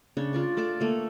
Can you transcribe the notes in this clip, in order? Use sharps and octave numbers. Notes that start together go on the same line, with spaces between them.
C#3 D4 C#5
D4 F4 D5 C#6
A3 D5 A5 D6
A3 A#3 C#5